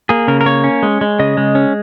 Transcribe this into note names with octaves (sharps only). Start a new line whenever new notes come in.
A#3 G#4
C#3 A#4
A#4
A#3 C#5
C#4
G#3
G#3
C#3 D#5
G#3
C#4